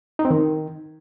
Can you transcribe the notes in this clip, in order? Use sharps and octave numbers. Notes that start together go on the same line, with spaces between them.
D#4
C4
D#3